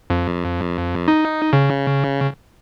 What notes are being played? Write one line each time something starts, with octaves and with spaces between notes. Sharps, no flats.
F2
D#4
C#3